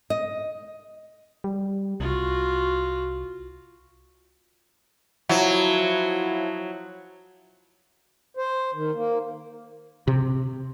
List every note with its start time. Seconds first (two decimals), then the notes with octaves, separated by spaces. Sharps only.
0.10 D#5
1.44 G3
2.00 C2 F4 F#4
5.29 F3 F#3 E4 F#5
8.37 C5
8.74 D#3
8.94 A#3
10.07 C3